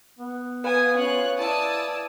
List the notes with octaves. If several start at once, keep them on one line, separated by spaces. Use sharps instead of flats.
B3
B4 F5 G#5 B5 D#6
C#4 F4 C#5 F#6
E4 D5 G#5 A5 D#6 E6